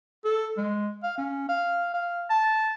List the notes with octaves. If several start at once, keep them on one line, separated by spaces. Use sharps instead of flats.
A4
G#3
F5
C#4
F5
F5
A5